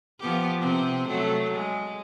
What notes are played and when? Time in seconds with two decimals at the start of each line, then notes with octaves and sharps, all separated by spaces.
0.20 F3 B3 G4
0.61 C3 C4
1.09 F#3 A3
1.54 G#3